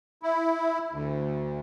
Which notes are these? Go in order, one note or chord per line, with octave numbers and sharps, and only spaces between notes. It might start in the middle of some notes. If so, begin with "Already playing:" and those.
E4
D2